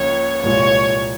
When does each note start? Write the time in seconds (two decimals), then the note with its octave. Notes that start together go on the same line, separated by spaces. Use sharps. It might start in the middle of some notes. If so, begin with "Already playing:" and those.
Already playing: C#2 C#3 F3 A#3 C#5
0.43 C2 A#2 F3 G#3 C#5